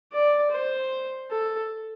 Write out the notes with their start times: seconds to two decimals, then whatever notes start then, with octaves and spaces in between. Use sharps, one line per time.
0.13 D5
0.52 C5
1.31 A4